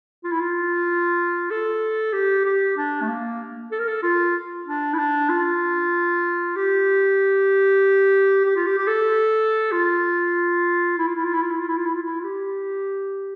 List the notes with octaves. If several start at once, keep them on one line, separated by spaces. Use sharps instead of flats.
F4
E4
F4
A4
G4
G4
D4
A3
A#3
A4
A#4
A4
F4
D4
E4
D4
F4
G4
G4
F4
G4
G4
A4
F4
E4
F4
E4
F4
E4
F4
E4
F4
E4
F4
E4
F4
E4
F4
G4